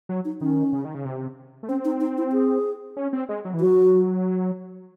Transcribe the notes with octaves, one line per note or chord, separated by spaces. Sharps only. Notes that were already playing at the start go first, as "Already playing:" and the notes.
F#3
D#4
D#3 C#4
C#3
D#3
C#3
C3
A3
C4 C#4
D#4
D#4
E4
G#4
C#4
C4
G#3
F#3
E3
F#3 F#4